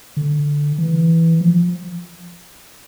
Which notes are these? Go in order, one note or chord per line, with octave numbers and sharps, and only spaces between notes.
D3
E3
F3